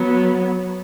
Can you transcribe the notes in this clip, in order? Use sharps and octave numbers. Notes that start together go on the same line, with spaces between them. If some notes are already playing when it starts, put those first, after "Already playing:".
Already playing: F#3 B3